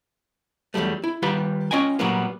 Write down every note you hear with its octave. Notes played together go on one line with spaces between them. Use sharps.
E2 C3 F#3 G3 A3
E4
D#3 G3 F4 G4 B4 B5
C#4 F4 D#5 G5 G#5
A#2 F#3 G3 A#3 B3